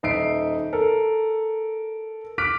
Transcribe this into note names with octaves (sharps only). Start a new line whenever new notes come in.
D#1 D#4 E5 C7 D7
A4 A#4
D6 F6 F#6 B6 D7